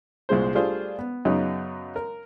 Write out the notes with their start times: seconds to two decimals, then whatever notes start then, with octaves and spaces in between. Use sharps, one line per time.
0.29 C2 A#2 G#3 C5
0.55 G3 A3 D4 F4 G#4 C5
0.99 B3
1.25 F#2 C#3 F#3 B3 D#4
1.96 A#4